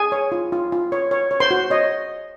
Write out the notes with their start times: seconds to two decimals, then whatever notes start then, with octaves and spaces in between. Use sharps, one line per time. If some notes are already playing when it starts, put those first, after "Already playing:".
Already playing: G#4 G#5
0.12 C#5
0.32 F4
0.52 F4
0.72 F4
0.92 C#5
1.11 C#5
1.31 C#5
1.40 C5 C6
1.51 F#4
1.70 C#5 D#5